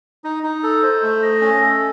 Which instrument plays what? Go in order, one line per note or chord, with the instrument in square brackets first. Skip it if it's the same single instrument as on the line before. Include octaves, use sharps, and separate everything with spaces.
[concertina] D#4
D#4
A4
C5
A3
D#5
C#4
A4